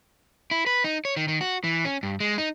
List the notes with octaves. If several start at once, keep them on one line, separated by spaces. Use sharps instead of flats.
E4
B4
D#4
C#5
D#3
D#3
F#4
E3
C#4
G2
G#3
D#4